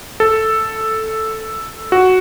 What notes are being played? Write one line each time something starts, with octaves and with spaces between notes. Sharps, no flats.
A4
F#4